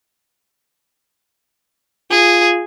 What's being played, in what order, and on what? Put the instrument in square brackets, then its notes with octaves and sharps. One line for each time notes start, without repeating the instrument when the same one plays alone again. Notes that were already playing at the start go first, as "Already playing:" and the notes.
[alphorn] F4 [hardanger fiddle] G#4